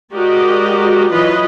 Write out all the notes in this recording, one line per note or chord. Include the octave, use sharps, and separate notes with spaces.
G#3 F#4 G4 A#4 D5 D#5
E3 F#3 F4 B4 D#5